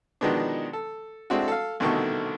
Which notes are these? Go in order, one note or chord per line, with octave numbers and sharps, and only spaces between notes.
B2 D#3 F3 G#3 B3 D4
A4
G#3 A3 C4 D4 E4 F#4
A4 F5
C2 B2 D3 D#3 A3 C#6